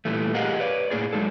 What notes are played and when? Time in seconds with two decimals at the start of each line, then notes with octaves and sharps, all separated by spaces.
0.05 A#2 E3 G3 A3
0.35 G4 G#4 A#4 D#5 F5 F#5
0.60 B4 C#5 D5
0.90 A2 A#3 F#4 G#4 D5
1.13 F#3 G#3 D#4 A4